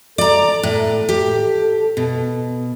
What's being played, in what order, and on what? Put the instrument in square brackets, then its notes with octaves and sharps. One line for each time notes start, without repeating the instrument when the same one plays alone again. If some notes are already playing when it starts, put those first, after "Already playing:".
[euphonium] A4 [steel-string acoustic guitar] D5 A#5
[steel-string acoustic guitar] A2
G4
B2